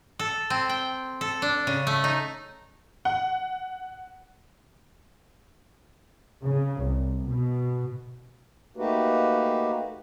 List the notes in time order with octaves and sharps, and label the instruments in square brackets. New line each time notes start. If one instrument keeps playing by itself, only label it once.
[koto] A4
C4
G5
A4
D4
C#3
A3
D#4
[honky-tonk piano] F#5
[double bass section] C#3
C2
B2
[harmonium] A3 A#3 D#4 F#4 G4 B4